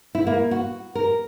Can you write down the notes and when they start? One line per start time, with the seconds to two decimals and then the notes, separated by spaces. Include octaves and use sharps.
0.15 E4
0.27 A#3
0.51 F#4
0.95 A#4